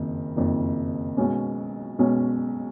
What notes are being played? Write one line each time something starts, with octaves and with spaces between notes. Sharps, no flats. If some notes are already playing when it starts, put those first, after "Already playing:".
Already playing: F#1 F2 D#3
F#1 F2 D#3
B1 B2 G#3 C#4
B1 B2 G#3 C#4